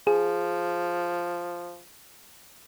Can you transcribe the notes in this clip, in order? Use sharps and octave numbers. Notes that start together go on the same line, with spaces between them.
F3 G#4